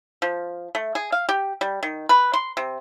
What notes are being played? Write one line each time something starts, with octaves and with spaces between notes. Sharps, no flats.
F3
A3
G#4
F5
G4
G3
D#3
B4
C6
C3